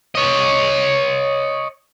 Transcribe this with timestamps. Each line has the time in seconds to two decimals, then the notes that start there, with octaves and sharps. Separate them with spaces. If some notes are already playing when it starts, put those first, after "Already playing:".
0.15 C#5 D#5